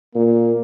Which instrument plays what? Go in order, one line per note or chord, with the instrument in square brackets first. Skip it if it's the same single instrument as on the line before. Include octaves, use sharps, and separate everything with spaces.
[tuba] A#2 [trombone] A#3